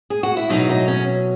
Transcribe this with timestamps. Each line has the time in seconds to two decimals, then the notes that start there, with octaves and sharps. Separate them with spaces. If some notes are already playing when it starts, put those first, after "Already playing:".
0.10 G#4
0.23 F#4
0.37 E4
0.50 B2 F#3 D#4
0.69 D#4
0.88 C#4